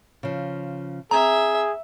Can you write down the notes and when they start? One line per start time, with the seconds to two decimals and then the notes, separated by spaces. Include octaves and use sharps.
0.23 C#3 F3
1.11 C4 G#4 E5 A#5